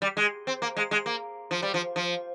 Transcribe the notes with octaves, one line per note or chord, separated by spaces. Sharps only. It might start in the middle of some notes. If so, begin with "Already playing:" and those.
G3
G#3
C4
A#3
G#3
G#3
A#3
F3
G3
F3
F3